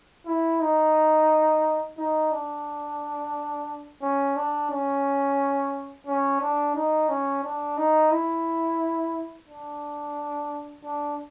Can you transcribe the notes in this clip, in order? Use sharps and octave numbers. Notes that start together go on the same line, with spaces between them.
E4
D#4
D#4
D4
C#4
D4
C#4
C#4
D4
D#4
C#4
D4
D#4
E4
D4
D4